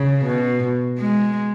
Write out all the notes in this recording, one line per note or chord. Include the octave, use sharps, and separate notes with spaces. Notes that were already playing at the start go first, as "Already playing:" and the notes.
Already playing: C#3
B2
G#3